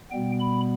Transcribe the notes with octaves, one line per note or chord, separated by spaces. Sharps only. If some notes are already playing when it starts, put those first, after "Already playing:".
B2 G3 B3 G5
B5